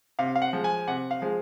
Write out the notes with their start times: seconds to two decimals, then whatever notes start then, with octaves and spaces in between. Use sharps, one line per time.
0.19 C3 F5
0.36 F5
0.42 F#5
0.53 F3 G#3
0.64 G#5
0.88 C3 F#5
1.11 F5
1.22 F3 G#3